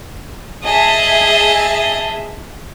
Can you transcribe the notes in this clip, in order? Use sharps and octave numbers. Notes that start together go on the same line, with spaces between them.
G#4 D#5 E5 A5